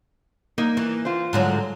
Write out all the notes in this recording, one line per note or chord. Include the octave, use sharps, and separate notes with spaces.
A#3 D#4
E3
F4 C5
G#2 D3 F#3